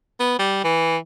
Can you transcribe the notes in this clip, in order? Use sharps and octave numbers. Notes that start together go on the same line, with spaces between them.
B3
G3
E3